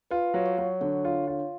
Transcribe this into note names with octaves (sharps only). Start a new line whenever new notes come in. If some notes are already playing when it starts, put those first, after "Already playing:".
F4 B4
F#3
C#5
F#3
D3 C#5
F4
F4